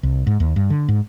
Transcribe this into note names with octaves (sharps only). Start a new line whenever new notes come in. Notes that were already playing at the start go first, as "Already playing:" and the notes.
C2
G#2
D#2
G2
D3
G#2